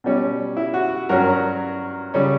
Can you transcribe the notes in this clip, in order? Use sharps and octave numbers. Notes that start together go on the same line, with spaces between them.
B2 G3 C#4
E4
F#4
G2 F#3 C#4 F#4 A#4
C#3 G3 C#4